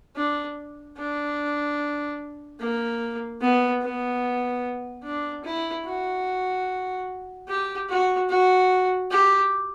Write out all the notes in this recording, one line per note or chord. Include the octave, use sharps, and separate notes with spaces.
D4
D4
A#3
B3
B3
D4
E4
F#4
G4
F#4
F#4
G4